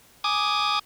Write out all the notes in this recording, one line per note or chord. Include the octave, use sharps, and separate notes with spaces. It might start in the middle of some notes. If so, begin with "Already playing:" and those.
G#5 D6 D#6